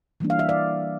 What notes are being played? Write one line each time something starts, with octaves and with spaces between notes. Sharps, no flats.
E3 G3 A#3 D4
F5
E5
D5 F5